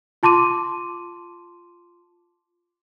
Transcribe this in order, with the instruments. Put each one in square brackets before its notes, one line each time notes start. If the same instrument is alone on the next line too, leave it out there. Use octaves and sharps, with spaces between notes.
[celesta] F4 A5 C6 D6 D#7